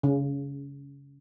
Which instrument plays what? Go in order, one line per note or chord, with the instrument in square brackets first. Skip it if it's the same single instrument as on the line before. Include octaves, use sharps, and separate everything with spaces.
[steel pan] C#3